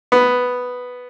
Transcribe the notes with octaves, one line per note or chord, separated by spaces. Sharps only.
B3